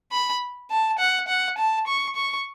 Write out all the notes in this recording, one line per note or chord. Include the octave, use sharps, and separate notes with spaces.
B5
A5
F#5
F#5
A5
C#6
C#6